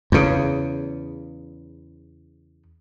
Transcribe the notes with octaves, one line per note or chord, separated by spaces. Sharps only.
E2 C#3